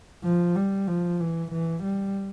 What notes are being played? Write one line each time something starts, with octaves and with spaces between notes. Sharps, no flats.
F3
G3
F3
E3
E3
G3